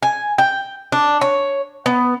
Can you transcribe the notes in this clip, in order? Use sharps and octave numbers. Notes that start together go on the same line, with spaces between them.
G#5
G5
D4
C#5
B3